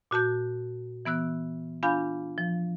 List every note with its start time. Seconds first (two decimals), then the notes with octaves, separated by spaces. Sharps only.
0.11 A#2 F#4 A5 G6
1.05 E3 B3 E6 F#6
1.83 D4 F4 F5 G#5 B5 G6
2.38 F3